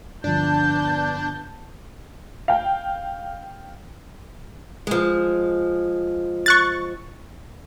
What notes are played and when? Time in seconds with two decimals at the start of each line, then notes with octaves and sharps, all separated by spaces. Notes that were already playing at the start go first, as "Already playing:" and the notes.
0.24 G2 D3 F3 B3 D4 A5 G6
2.48 F5 G5
4.87 F3 G#3
6.46 C#6 F#6 A6